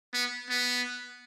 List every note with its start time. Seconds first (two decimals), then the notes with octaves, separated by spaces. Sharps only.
0.14 B3
0.49 B3